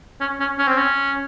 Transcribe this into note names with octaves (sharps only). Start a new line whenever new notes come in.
C#4
C#4
C#4
C4
C#4